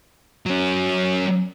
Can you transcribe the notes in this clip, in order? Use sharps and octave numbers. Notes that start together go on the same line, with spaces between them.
F#3 C#4